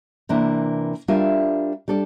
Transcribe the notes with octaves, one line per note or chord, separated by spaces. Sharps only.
C3 E3 A#3 D4
G3 D4 F4 A#4 E5
G3 D4 A4 D5